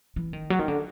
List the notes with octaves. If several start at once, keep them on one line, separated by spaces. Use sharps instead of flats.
E3
D#3
F#3
D#3
D3